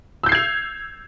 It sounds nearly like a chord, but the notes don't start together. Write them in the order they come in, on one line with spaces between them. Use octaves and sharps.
E6 G6 C7 G#6 F7